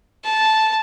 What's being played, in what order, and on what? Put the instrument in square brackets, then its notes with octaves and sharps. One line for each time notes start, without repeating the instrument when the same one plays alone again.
[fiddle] A5